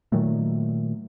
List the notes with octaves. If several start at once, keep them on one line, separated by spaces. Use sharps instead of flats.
A#2 D#3 F#3 A3